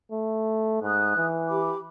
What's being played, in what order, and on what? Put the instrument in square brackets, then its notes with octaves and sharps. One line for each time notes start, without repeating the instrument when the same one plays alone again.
[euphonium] A3
[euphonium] G#2 [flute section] D#6 F#6
[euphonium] E3
[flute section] G4 B5 D6